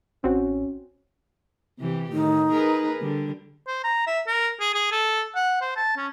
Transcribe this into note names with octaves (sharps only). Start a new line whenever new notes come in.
A1 C4 C#4 F#4
C3 E3 G4
A2 D#3 D#4
G#4 A#4 B4
D3 G3
C5
A#5
E5
A#4
G#4
G#4
A4
F#5
C5
A5
C#4